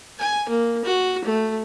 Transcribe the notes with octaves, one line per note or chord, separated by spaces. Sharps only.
G#5
A#3
F#4
A3